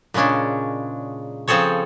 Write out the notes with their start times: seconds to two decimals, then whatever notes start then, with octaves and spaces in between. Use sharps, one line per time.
0.14 A#2 C#3 G#3 C#4 D4
1.48 C#3 F3 C4 G#4 A4 C#5